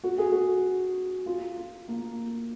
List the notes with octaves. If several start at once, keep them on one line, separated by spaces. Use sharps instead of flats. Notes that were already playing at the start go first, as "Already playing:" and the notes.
F#4
G#4
F#4
F4
F4
A#3